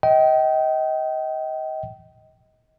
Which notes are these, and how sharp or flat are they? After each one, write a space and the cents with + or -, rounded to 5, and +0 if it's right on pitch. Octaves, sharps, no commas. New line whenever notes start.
D#5 +25 G5 -25